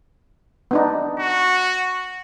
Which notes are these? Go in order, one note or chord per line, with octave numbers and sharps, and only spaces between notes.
B3 D4 D#4
F#4